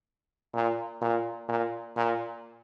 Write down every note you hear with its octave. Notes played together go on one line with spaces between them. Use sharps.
A#2
A#2
A#2
A#2